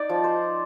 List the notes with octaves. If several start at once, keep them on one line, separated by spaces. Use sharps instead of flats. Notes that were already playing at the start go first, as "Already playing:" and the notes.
Already playing: D#4 D5
F3
C5